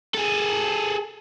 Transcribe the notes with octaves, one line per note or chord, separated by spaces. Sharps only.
G#4 A4